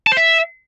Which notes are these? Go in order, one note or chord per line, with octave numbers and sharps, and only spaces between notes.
A5
C5
E5